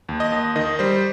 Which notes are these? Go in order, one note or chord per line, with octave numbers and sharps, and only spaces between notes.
D#2
D#5
D#2
D#3 D#5
G3 C5